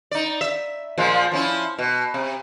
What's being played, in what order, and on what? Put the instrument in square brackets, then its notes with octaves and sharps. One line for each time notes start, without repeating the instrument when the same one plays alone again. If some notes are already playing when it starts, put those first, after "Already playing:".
[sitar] D#4 D5
E5
A#2 F3 G#3
F3 C#4 E4
B2
C3